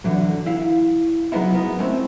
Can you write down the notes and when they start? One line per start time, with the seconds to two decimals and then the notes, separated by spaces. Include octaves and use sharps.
0.04 D3 E3 F#3
0.46 E4 F5
1.32 C#3 F#3 G#3 B3 D#4 E4
1.54 B3 A#4 A#5
1.79 G#3 A3 C4 C#4 E4